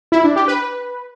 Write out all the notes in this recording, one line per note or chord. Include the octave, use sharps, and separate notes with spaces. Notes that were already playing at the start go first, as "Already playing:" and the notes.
E4
D4
G4
B4